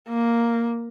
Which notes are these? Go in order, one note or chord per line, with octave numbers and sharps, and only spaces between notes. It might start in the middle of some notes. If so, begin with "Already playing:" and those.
A#3